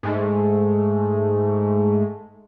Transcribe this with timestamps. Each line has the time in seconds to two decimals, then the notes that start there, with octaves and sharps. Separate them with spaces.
0.03 G#2 G#3 A3